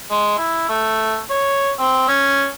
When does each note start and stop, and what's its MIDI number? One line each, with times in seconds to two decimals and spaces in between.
0.11 0.37 56
0.38 0.66 64
0.69 1.19 57
1.30 1.72 73
1.79 2.04 60
2.08 2.48 61